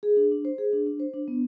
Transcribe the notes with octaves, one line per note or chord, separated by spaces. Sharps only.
G#4
D4
D4
C5
G#4
D4
D4
C5
D4
B3